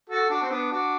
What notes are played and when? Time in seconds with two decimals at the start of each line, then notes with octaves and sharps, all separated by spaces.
0.09 F#4 A4
0.30 D4 F#4
0.42 C4
0.51 B3 D4
0.72 D4 F#4